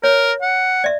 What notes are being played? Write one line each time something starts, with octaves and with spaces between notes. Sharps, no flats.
A#4 C#5
F#5
D5 E5